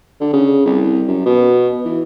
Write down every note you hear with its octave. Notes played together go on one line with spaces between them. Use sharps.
D3
C#3
C2
F#2
B2
E3